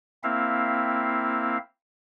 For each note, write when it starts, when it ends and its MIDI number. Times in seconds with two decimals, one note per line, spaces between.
0.23 1.58 58
0.23 1.58 60
0.23 1.58 64
0.23 1.58 76
0.23 1.58 77